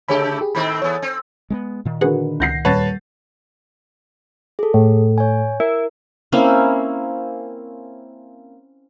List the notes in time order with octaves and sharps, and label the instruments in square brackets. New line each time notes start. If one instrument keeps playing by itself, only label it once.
[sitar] C#3 A3 G4 [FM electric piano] G#4 C#5 B5
[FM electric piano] G4 G#4
[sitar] A2 D#3 C4 [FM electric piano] B5
[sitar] E2 B3 [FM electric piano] C#5
[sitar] C4
[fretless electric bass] G#3 A#3 B3
A#2 D#3
[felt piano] D3 A#4 B4 [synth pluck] F#4 G#4 F#5
[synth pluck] C#2 F#5 [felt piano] G6 A#6 C7
[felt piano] D#1 A6 [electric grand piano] B4 C#5 A5 [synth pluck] F#5
[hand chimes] G#4 A4
[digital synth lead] A2
[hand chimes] C#5 G#5
[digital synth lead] E4 [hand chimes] A#4
[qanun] A#3 C4 C#4 E4